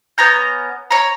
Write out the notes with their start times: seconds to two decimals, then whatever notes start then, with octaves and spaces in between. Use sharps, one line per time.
0.18 B3 C#4 A#5 G6
0.91 C#5 A#5